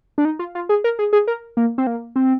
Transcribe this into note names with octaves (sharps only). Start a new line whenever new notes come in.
D4
D#4
F4
F4
G#4
A#4
G#4
G#4
A#4
A#3
C4
A#3
C4